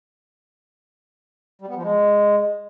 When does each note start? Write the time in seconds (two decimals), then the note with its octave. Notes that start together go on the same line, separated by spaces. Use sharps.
1.61 G3
1.69 B3
1.76 F3
1.83 G#3